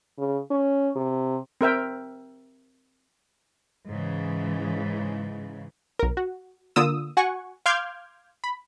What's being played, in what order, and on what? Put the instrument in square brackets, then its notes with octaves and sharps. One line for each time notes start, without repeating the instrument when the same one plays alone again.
[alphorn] C#3
C#4
C3
[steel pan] C4 A#4 E5 G5
[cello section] G#2 C#3 E3
[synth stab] B1 A#4
F#4
D3 A#3 F4 D#6 E6
F#4 F#5 G#5 C#6
F5 C6 D6 F6 G6 G#6
B5